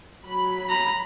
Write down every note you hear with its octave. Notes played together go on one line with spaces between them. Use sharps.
F#3 B5
A#5